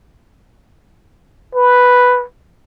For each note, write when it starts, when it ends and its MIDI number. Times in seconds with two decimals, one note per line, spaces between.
1.55 2.24 71